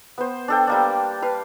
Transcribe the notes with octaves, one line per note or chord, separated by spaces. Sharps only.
B3 C5
D4 A4 G5
G3 A#3 D4
B4 F5